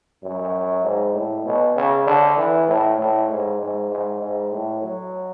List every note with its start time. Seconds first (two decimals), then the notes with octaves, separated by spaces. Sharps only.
0.23 F#2
0.84 G#2
1.15 A2
1.45 B2
1.76 C#3
2.06 D3
2.37 E3
2.68 A2
2.98 A2
3.29 G#2
3.60 G#2
3.91 G#2
4.21 G#2
4.52 A2
4.82 F#3